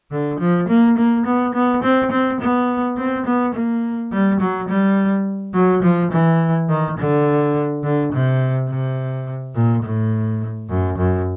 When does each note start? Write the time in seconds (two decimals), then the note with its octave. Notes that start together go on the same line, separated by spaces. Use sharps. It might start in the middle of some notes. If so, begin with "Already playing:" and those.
0.11 D3
0.39 F3
0.68 A#3
0.97 A#3
1.25 B3
1.54 B3
1.83 C4
2.11 C4
2.40 B3
2.97 C4
3.25 B3
3.54 A#3
4.12 G3
4.40 F#3
4.68 G3
5.54 F#3
5.83 F3
6.11 E3
6.68 D#3
6.98 D3
7.83 D3
8.12 C3
8.69 C3
9.55 A#2
9.83 A2
10.69 F#2
10.97 F#2